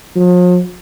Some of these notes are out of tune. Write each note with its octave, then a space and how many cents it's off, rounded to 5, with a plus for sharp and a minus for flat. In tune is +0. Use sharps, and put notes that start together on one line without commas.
F3 +45